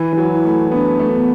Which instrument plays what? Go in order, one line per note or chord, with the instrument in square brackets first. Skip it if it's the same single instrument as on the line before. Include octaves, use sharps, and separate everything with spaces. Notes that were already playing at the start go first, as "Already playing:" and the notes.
Already playing: [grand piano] E3 [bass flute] E4
[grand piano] E3
F#3
[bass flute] E4
[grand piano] A3
[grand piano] B3 [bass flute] D4
[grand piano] A3
[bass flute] B3